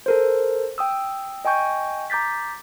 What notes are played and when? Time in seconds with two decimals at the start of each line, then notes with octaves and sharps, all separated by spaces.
0.06 A4 A#4 C5
0.78 G5 D#6 E6
1.45 D#5 G5 G#5 C#6 G6
2.10 A#5 D6 G6 A6 B6